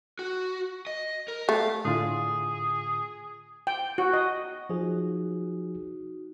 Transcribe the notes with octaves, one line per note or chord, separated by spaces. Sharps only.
F#4
D#5
A#4
A3 F5
A2 D3 F4 G#4
G5
F#4
D#5
F3 D#4 F#4 G#4